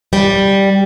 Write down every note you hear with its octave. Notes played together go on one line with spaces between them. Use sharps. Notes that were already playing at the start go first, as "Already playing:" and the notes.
G3